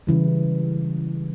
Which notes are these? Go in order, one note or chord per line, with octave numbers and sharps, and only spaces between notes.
C#3 E3 G3